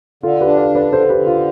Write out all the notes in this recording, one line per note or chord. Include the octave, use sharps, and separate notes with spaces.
D3 F4 A4
G4 B4
D4
D5 F5
D3
B4 D5
D3 A4 C5
G4 B4
D3
F4